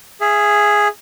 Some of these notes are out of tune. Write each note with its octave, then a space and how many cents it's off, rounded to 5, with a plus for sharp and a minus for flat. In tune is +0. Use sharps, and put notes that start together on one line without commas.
G#4 +0 E5 +30